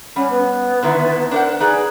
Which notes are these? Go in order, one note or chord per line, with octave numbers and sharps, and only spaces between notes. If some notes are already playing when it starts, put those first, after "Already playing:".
G3 C#4 F#5
B3
D3 D#3 E4
D4 A#4 C5 F#5
D#4 G#4 B4 D5